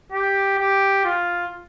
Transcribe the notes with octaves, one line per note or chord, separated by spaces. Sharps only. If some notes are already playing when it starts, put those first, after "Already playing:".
G4
G4
F4